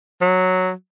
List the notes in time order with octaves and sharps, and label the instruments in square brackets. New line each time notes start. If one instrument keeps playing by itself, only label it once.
[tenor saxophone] F#3